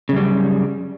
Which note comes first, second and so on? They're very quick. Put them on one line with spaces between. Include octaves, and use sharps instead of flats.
C#3 F#2 G3